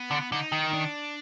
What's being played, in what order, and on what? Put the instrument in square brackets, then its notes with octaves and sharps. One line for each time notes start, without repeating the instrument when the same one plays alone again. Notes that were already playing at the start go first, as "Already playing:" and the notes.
Already playing: [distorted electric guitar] B3
[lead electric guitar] D3
[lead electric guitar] D3 [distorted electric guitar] D#4
[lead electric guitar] D#3
[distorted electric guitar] D4